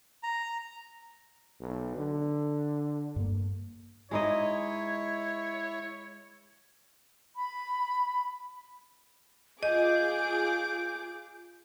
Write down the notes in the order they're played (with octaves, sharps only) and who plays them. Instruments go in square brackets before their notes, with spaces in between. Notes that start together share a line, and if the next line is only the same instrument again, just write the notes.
[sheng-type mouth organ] A#5
[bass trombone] B1
D3
[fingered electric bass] G2 A#3
[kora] G#3 D#4 D#5 [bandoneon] E4 [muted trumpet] C#5
[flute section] B5
[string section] F4 G#4 D6 [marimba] D#5 [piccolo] G6